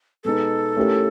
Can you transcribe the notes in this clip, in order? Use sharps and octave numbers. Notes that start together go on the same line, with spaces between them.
B2 G#3 B3 D#4 A4
A3 C#4 E4 G4 A#4